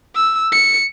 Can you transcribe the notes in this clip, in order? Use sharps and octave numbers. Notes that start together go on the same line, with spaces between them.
E6
C#7